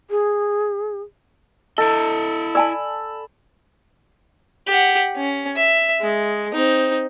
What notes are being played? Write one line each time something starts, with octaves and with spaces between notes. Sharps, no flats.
G#4
E4 A4 D#5
D5 G#5 A5 B5 E6
G4 F#5
C#4
E5
G#3
C4 D#4